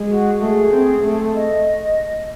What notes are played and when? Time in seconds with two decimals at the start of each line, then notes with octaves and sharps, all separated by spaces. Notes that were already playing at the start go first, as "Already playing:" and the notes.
Already playing: G#3
0.09 F#4
0.40 A3 G#4
0.72 C4
1.03 A3
1.35 D#5